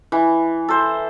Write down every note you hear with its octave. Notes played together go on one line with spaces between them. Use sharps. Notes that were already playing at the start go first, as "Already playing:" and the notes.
E3
A4 C5